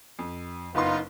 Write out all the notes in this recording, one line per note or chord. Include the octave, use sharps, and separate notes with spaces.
F2
F#1 B3 D#4 F4 C6